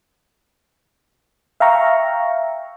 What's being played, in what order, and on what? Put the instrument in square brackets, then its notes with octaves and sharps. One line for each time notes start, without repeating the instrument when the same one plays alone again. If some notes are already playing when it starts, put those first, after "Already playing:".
[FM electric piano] E5 F5 G5 A#5 C#6